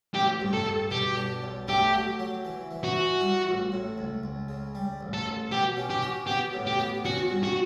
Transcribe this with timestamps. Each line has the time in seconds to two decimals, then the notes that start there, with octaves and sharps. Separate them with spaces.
0.15 A1 G4
0.41 G2
0.53 A4
0.66 G2
0.91 B2 G4
1.17 D4
1.43 B1
1.68 A3 G4
1.94 F#3
2.19 F#3
2.45 E3
2.71 E3
2.84 F#4
2.95 E3
3.21 G3
3.47 A1
3.72 A2
3.98 C#2
4.24 C#2
4.48 C#3
4.75 G3
5.01 A1
5.13 A4
5.26 A1
5.52 B2 G4
5.77 C#4
5.90 G4
6.02 F#4
6.27 B3 G4
6.54 A2
6.67 G4
6.79 B3
7.05 C#4 F#4
7.30 G2
7.44 F#4